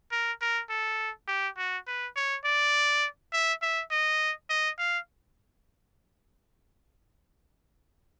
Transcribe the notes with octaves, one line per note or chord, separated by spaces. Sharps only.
A#4
A#4
A4
G4
F#4
B4
C#5
D5
E5
E5
D#5
D#5
F5